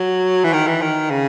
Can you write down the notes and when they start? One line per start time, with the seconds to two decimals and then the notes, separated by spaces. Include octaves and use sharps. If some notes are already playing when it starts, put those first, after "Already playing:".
Already playing: F#3
0.44 E3
0.53 D#3
0.67 E3
0.82 D#3
1.11 C#3